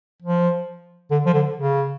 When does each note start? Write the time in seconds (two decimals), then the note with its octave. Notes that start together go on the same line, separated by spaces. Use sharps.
0.22 F3
1.11 D3
1.26 F3
1.34 D3
1.56 C#3